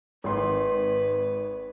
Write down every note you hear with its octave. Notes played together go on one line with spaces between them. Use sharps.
G#1 B4 C6